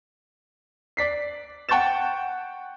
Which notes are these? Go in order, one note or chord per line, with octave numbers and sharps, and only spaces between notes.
D5 B6 C7
F#5 G5 C#6 G6 A6 E7